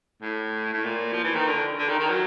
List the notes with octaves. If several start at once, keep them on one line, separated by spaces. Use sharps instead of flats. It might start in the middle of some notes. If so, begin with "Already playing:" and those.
A2
A2
A#2
F3
E3
D#3
D3
D3
D#3
D#3
F#3